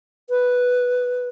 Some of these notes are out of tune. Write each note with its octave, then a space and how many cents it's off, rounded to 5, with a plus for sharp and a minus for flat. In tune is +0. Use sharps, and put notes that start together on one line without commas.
B4 +0